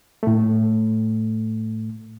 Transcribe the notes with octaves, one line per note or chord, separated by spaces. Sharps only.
A2 A3